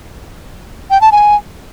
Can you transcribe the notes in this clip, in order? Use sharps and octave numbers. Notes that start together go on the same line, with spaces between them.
G5
A5
G#5